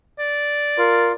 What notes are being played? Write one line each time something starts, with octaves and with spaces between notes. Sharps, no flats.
D5
F4 A#4